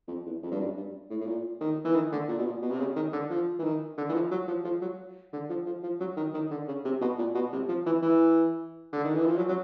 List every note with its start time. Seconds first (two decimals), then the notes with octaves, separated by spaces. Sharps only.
0.08 F2
0.26 E2
0.43 F2
0.52 G2
0.60 F#2
0.77 G2
1.10 A2
1.21 A2
1.27 A#2
1.61 D#3
1.85 E3
1.95 D#3
2.12 D3
2.29 A#2
2.39 B2
2.45 A#2
2.62 B2
2.71 C3
2.80 C#3
2.96 D#3
3.13 D3
3.30 F3
3.59 E3
3.64 D#3
3.98 D3
4.09 E3
4.14 F3
4.31 F#3
4.48 F3
4.64 F3
4.82 F#3
5.33 D3
5.49 F3
5.66 F3
5.83 F3
6.00 F#3
6.17 D#3
6.34 D#3
6.51 D3
6.68 C#3
6.85 C3
7.01 B2
7.19 A#2
7.35 B2
7.53 C3
7.69 F3
7.86 E3
8.02 E3
8.93 D3
9.04 D#3
9.15 E3
9.26 F3
9.37 F#3
9.48 F#3